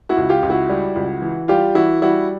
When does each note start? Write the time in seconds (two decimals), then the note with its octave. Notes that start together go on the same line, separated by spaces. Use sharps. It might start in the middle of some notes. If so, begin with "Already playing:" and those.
0.09 E4 F#4
0.17 C#2
0.29 F4 G4
0.42 C#2
0.50 E4 F#4
0.69 G3
0.95 C#2
1.22 E3
1.48 G3 F4 G4
1.75 E3 E4 F#4
2.02 G3 E4 F#4